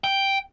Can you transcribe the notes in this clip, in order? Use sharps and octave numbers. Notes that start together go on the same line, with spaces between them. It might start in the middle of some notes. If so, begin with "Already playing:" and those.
G5